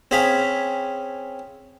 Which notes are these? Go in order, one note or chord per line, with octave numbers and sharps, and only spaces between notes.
C4 C#4 G#4 F5 B5